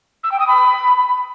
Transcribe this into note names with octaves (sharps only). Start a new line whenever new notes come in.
E6
G5
D#6
B5